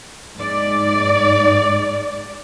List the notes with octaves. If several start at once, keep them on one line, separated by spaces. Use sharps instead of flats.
G#2 D5